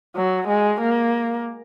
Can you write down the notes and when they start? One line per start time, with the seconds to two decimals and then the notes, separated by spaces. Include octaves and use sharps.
0.16 F#3
0.48 G#3
0.81 A#3